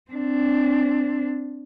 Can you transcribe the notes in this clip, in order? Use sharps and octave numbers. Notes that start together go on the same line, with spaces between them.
C4 D4